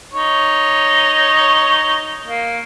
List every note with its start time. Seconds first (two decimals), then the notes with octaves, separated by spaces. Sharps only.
0.12 D#4 C#5
2.24 A#3